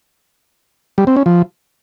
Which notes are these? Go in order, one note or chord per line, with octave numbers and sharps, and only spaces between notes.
G3
C4
C#4
F3